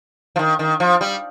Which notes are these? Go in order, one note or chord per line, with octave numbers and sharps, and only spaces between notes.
F3
D#3
D#3
F3
G3